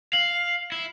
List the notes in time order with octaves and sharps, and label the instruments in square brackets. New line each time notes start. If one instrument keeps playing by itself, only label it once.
[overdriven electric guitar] F5 [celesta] F#7
[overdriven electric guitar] E4